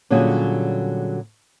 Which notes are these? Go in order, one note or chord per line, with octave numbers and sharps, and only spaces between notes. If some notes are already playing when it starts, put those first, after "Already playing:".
A#2 D3 F#3 G3 C#4 G#4